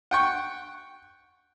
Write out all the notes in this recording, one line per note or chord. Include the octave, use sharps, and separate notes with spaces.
F#5 G5 C#6